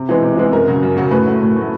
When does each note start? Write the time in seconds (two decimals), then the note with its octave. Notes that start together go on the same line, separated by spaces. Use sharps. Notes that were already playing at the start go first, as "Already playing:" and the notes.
Already playing: C3
0.09 E3 G#3 B3
0.23 C3
0.37 E3 G#3 B3
0.52 F#2 A#4
0.68 C#3 F#3
0.83 F#2
0.97 C#3 F#3
1.11 A2 B4
1.26 F#3 A3
1.42 A2
1.56 F#3 A3